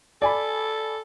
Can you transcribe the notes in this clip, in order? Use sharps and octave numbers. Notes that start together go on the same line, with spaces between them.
A4 D5 G#5 B5